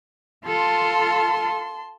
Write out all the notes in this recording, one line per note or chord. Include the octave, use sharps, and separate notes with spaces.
F4 A4 A5 C6